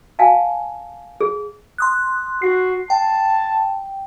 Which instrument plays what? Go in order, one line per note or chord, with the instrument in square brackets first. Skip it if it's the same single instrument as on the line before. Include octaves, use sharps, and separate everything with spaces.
[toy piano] F5 G#5 A5
G#4
[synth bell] C6 D#6 F#6
[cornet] F#4 [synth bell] C7
[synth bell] G5 [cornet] A5